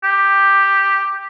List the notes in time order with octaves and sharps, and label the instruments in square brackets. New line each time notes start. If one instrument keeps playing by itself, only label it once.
[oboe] G4